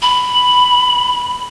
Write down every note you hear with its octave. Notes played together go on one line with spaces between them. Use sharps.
B5